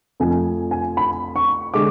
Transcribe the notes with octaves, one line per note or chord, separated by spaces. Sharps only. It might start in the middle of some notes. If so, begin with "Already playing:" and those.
F2 F3 A3 G#5
G#5
B5
C#6
D3 G#3 D6